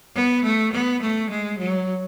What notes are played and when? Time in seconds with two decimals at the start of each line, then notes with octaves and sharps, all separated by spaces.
0.15 B3
0.44 A3
0.72 B3
1.01 A3
1.30 G#3
1.59 F#3